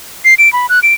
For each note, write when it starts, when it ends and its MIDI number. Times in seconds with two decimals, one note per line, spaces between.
0.25 0.34 96
0.39 0.52 98
0.53 0.67 83
0.69 0.80 90
0.83 0.94 98